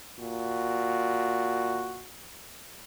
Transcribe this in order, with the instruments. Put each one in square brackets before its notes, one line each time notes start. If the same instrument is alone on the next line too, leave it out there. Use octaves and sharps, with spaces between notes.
[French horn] A#2 [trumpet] F#4